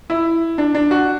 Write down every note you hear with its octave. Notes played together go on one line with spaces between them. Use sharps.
E4
D4
D4
F#4